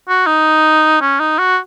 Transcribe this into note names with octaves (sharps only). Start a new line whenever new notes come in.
F#4
D#4
C#4
D#4
F#4